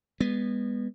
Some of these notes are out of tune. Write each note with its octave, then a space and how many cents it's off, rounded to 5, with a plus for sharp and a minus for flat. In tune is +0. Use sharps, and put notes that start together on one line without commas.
G#3 -30 B3 -5